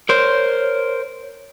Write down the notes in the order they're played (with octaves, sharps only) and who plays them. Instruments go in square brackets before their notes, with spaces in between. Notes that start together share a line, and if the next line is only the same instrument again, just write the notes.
[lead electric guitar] A#4 C5 [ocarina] C#5